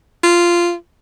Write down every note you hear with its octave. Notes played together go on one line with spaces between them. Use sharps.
F4